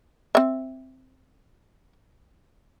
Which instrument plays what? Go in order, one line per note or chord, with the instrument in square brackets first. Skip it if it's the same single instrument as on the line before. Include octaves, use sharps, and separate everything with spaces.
[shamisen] C4 E5